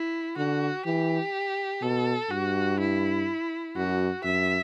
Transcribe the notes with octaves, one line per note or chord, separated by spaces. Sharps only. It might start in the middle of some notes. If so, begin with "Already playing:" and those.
Already playing: E4
D3 F#4
E3 G4
B2 A4
G2 F#4
E4
F#2 F#4
F#2 E5